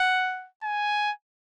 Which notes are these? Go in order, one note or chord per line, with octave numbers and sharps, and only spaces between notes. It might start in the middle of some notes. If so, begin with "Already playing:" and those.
Already playing: F#5
G#5